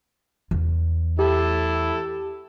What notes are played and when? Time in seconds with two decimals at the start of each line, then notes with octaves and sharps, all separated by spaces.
0.51 E2
1.19 E4 G4 A4